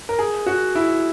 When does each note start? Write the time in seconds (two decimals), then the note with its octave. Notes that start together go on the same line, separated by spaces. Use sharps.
0.09 A#4
0.19 G#4
0.46 F#4
0.75 E4